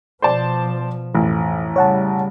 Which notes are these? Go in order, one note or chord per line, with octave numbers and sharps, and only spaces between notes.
B2 F3 C5 D5 A5
A1 F2 E3
C#3 G3 C#5 F#5 A5